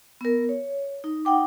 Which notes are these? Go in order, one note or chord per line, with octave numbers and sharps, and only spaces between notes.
B3 A#4
C#5
D#4
D#4 F#5 G5 D6